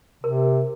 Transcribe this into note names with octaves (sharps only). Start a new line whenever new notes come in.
C3 A#4